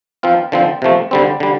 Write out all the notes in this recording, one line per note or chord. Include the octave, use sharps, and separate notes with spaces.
F3 C4 F4
D3 F3 C4
C3 F3 A3
D3 G3 C4
D3 G3